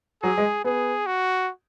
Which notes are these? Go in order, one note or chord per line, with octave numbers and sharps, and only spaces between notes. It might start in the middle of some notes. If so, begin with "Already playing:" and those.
F#3 G#4
G#3
B3 G#4
F#4